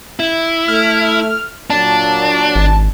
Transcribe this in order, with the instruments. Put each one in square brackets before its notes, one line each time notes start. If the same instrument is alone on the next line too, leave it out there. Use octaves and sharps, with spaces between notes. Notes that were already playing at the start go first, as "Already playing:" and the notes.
[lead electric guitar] E4
[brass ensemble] A3 [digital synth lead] F6
[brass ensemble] A#2 F#3 [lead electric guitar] D4 [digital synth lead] A5
[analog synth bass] G#1